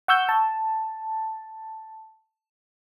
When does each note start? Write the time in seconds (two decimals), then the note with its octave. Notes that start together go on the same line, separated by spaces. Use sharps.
0.08 F#5 C#6 E6 G6
0.29 A5